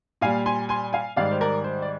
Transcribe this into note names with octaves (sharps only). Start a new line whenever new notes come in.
A#2 G3 F5 G#5
G#5 C6
G#5 C6
F5 G#5
G#2 D#3 G3 D5 F5
C5
A#4 D5
C5
D5